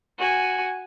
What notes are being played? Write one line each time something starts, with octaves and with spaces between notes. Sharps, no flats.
F#4 G#5